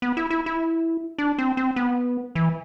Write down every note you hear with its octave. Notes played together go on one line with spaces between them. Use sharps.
B3
E4
E4
E4
D4
C4
C4
B3
E3